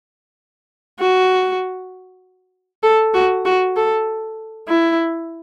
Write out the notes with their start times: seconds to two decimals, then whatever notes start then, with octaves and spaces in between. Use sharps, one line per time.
1.00 F#4
2.83 A4
3.14 F#4
3.45 F#4
3.76 A4
4.68 E4